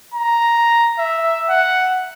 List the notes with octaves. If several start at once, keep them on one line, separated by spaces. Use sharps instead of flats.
A#5
E5
F#5